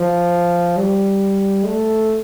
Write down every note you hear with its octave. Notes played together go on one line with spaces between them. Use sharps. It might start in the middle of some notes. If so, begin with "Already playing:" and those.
Already playing: F3
G3
A3